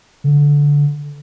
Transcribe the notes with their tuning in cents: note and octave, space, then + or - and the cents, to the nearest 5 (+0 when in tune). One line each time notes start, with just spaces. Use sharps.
D3 -15